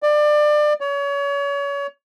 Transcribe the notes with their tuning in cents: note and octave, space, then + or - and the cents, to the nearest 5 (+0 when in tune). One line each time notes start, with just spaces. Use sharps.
D5 +25
C#5 +30